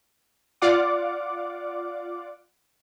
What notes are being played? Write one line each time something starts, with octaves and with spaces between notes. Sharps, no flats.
F4 D5 F5 F#5 D6